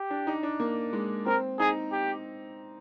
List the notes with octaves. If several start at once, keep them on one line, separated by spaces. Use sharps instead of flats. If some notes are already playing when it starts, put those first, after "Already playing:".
Already playing: G4
D4
D#4
D4
A#3
G#3
C4 A#4
D#4 G#4
G4